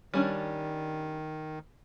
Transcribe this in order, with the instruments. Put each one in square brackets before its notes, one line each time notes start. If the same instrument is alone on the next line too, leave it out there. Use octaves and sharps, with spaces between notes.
[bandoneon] D#3 [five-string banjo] G3 C#4 D4